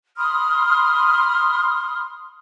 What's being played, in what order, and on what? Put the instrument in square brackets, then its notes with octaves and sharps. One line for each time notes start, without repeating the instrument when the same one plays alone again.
[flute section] B5 C6 D#6 F6